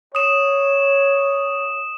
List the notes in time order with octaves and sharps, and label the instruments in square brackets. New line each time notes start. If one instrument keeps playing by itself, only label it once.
[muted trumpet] C#5 [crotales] D#6 E7